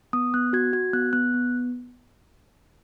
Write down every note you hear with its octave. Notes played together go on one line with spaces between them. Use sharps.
B3 D#6
B3 F#6
F#4 G#6
F#4 G#6
B3 F#6
B3 F#6
B3